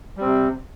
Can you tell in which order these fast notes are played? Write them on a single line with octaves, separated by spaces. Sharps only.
G3 C4 C3